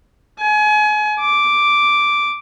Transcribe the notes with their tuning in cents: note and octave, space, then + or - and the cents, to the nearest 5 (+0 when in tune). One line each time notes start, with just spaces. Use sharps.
G#5 +30
D6 +0